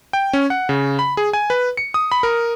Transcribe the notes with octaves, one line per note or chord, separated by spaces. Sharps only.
G5
C#4
F#5
C#3
B5
G#4
G#5
B4
C#7
D#6
B5
A#4